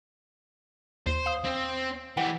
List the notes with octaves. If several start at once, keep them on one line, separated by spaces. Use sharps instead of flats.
D#2 C5
F5 D#6
C4
E3 G4 F#5 G5